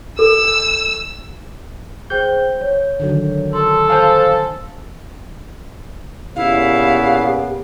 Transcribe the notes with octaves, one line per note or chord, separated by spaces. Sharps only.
A4 E6
G#4 C5 G5 G6
C#5
D3 D#3 F#3
A4 C6
C5 F5 G#5 A5
A#2 C#3 B3 E4 G4 F5